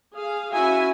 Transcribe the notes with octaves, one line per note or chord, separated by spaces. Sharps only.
G#4 F5
C#4 E4 F#4 E5 G#5